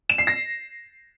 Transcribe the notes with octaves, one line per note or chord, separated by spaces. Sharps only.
E7
C7
A#6